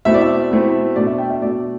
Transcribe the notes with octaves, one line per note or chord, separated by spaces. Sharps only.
B2 A3 C4 E4 E5
D5
E5
B2 A3 C4 E4
B2 A3 D4 D5
E5
G5
E5
B2 A3 D4 D5